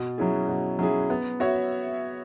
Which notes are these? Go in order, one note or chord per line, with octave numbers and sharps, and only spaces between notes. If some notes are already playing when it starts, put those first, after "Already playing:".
Already playing: B2
F#3 C#4 E4 G#4
B2
F#3 C#4 E4 G#4
B3
F#4 C#5 E5